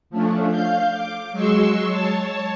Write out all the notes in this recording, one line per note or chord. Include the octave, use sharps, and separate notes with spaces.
F3 A3 C#4 D4
F5 G6
D6
F#3 G#3 C6 C#6 E6
C#5 A5